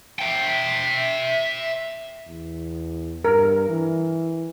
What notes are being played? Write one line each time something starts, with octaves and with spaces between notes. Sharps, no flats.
E5 G5
E2
G2 A#4
E3